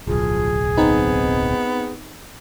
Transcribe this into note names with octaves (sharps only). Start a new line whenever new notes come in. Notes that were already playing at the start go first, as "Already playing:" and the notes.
D1 B1 F3 G#4
B3 C4 D#4